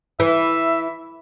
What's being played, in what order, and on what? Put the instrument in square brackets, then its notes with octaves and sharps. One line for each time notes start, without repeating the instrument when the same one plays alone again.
[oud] E3 [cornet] E5